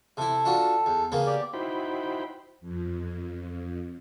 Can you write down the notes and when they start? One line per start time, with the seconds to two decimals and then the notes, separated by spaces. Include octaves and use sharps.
0.17 C3 E4 A4
0.45 D4 F4 F#4
0.86 E2
1.12 C#3 A#3 B3
1.27 G4 D5
1.53 D#4 E4 F#4 C5 G5 B5
2.61 F2